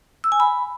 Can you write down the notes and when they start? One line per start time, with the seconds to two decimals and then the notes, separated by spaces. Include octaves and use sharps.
0.24 E6
0.32 G#5
0.40 B5